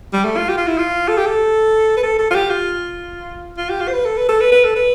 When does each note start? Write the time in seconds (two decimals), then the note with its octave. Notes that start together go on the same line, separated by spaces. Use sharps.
0.13 G3
0.25 A3
0.37 F4
0.49 G4
0.57 F4
0.67 E4
0.78 F4
1.08 A4
1.18 G4
1.26 A4
1.97 B4
2.03 A4
2.19 A4
2.31 F4
2.35 G4
2.50 F4
3.57 F4
3.70 G4
3.81 F4
3.88 C5
3.93 B4
4.05 A4
4.17 B4
4.29 A4
4.41 B4
4.52 B4
4.64 A4
4.76 B4